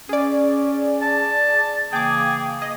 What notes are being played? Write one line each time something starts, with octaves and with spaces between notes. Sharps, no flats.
C#4 G#4 D5
A5
C#3 E3 A#3 G#4 G5 D6
D#5